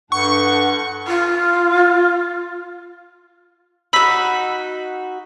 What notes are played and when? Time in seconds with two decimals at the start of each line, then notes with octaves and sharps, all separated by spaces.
0.12 G2 A4 F#5 C#6
1.07 F4
3.93 D#4 F#4 B5 E6 B6